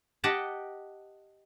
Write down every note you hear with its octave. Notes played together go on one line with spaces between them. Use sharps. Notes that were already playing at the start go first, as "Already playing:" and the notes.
G4 D#5 F#5 G5 A5